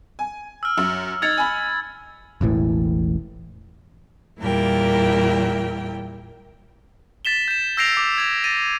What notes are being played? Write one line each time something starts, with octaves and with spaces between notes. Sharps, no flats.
G#5
E6 F6
F#2
D#4 E6 G#6 A6 C#7 F7
G#5 B5
E1 A1 A2 E3
E2 A#2 G3 E4 A#4 G5
A6 B6 E7 G7
G6 E7
E6 G6 A#6 C7 D7 F7
D6
G#6 F7
A6 A#6 D#7